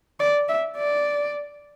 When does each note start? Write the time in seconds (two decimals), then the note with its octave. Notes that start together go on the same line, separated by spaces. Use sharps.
0.20 D5
0.48 E5
0.77 D5